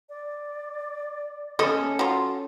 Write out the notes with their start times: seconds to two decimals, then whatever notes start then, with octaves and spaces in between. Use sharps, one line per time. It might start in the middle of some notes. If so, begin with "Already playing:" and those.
0.09 D5
1.59 A3 C#4 A4 D#5
1.99 F#3 F4